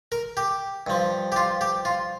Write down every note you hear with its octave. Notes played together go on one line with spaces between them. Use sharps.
A#4
G4
G2 F3
G4
F4
G4
F4